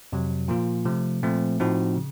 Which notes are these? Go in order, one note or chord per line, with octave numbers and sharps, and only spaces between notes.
F2 C3 F#3
A#2 F3 A#3 F4
C3 F3 A3
A#2 F3 A3 C4
A2 F3 C4 D#4 F#4
C#3